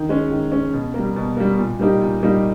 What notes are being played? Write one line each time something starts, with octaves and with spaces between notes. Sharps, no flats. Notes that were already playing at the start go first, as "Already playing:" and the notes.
Already playing: D#3
G#3 C#4
D#3
G#3 C#4
B2
G3 A#3
B2
G3 A#3
A#2
G3 A#3 D#4 G4
A#2
G3 A#3 D#4 G4